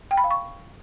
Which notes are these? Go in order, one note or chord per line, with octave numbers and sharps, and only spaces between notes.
G5
B5
F5
C#6